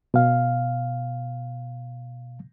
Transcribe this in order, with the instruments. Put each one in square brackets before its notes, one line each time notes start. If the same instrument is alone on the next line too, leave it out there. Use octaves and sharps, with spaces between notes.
[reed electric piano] B2 F5